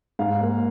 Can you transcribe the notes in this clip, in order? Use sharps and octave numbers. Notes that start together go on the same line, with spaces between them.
G#2 F5
A#3